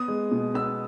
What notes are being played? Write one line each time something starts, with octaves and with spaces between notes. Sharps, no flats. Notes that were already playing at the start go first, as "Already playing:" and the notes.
Already playing: B3 D#6
G#3
B2
B3 E6